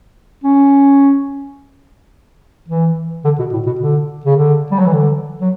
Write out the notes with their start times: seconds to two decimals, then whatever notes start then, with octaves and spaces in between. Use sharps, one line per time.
0.44 C#4
2.69 E3
3.25 D3
3.39 B2
3.53 A2
3.66 B2
3.81 D3
4.26 C#3
4.37 D3
4.72 G3
4.79 F#3
4.86 E3
4.93 D3
5.41 F#3